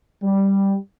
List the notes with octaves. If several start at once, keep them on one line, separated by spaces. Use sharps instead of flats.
G3